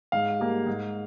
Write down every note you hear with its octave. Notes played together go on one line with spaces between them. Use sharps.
G#2 F5
G3 A#3
G#2